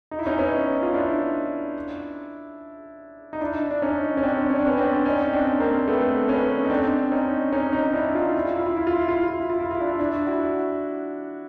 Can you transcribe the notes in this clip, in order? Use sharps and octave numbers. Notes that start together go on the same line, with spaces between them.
D#4
E4
C#4 D#4
B3 C#4
F4
D4 E4
D#4
D4 E4
D4
C#4 D#4
C#4
C4 D4
C#4
D4
B3 C#4
C4 D4
C#4 D#4
C4 D4
A#3 C4
A3 B3
B3 C#4
D#4
C4 D4
C#4 D#4
C#4 D#4
C#4 D#4
D4 E4
D#4 F4
E4
F4
E4
F4
E4
F4
E4
F4
E4
F4
E4
F4
E4
F4
D4 E4
D4 E4
E4 F#4